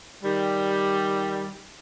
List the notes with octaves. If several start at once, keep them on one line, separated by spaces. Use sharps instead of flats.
D#3 G3